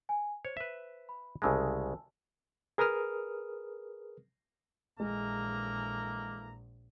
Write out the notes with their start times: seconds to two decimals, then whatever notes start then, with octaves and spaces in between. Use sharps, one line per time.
0.09 G#5
0.45 C5 C#5
0.57 B4 E5
1.09 B5
1.42 C2 C#3 G#3 G#5 A5 E6
2.78 G#4 A#4 B4 D#6 F6
5.00 A#1 E3 G#3 A#3 A4 A#5